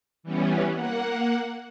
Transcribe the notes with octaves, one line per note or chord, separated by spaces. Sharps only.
E3 G3 B3 C#4
A#3 F#5